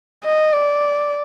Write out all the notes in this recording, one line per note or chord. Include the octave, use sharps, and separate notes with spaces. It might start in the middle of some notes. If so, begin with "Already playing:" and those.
D#5
D5